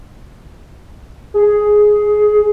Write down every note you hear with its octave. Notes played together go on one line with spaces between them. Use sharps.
G#4